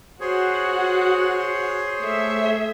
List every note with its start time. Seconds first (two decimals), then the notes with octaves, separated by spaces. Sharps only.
0.21 F#4 G#4 C5 C#5 F#5
2.00 A3 E5